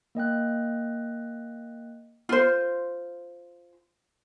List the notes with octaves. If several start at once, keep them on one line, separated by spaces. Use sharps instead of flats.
A#3 D#5 G5 F#6
F4 C5